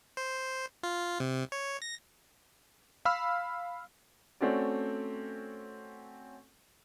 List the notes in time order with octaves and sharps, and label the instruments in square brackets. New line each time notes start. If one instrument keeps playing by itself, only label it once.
[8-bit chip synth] C5
F4
C3
C#5
A#6
[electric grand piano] F5 B5 E6 F6
[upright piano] A3 C4 C#4 F#4 D5